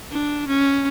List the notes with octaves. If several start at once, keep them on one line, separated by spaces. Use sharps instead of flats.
D4
C#4